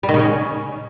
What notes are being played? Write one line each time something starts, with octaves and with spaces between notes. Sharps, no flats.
G3
D#3
C#3
C#4